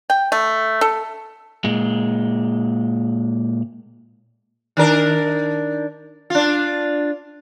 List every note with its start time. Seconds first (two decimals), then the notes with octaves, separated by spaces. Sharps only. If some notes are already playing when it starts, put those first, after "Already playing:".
0.10 G5
0.32 A3
0.81 A4
1.64 A#2 G#3
4.77 D#3 D4 A#4
6.30 D4 F4